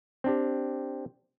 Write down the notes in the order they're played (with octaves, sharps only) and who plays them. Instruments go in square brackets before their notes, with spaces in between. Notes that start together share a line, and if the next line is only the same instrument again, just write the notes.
[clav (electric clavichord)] C4 D4 G4